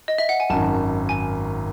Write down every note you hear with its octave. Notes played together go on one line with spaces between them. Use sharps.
D#5
E5
F#5
G#5
G#1 F#2 D#3 A5
G#5